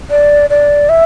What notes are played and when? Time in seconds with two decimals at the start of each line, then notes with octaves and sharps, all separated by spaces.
0.10 D5
0.50 D5
0.89 E5